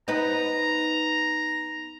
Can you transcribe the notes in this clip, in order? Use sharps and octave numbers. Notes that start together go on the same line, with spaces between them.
B3 D#4 B4 A#5